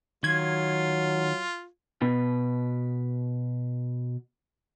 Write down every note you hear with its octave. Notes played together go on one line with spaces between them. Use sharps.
D#3 F#3 F4 G#6
B2 B4